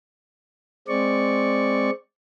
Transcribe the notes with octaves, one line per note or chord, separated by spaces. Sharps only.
G#3 C4 D5 C#6